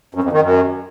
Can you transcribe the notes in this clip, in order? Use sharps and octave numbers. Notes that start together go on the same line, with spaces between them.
F#2
F2
D#3
F#2